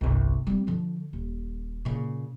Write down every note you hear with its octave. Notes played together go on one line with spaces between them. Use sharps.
G1 C2
G3 C4
D3 F3
D#1
A#2 C#3